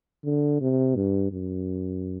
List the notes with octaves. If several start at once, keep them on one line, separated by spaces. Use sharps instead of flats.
D3
C3
G2
F#2